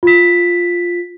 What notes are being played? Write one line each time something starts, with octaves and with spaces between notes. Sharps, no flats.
F4 B6